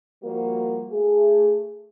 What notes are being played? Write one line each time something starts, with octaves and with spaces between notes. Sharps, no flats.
F3 G3 A#3 F#4 A#4
A3 G#4